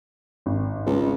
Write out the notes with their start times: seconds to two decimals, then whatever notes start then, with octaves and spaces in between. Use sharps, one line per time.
0.46 G#1
0.86 C#2